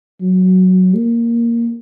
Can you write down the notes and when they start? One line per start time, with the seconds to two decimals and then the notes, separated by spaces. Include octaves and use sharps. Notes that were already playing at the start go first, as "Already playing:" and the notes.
0.21 F#3
0.95 A#3